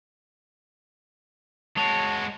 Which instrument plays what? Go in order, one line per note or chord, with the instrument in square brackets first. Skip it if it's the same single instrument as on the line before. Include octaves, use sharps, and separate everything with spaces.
[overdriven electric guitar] G#3 F#4 [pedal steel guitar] C#5 [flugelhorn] A5